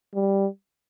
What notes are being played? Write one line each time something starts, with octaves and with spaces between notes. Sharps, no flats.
G3